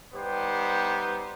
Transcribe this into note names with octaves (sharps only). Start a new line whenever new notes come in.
G3 B3 D#4 G4 C5